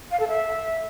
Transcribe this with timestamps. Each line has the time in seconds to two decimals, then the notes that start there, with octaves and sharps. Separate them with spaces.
0.11 F5
0.20 A4
0.28 E5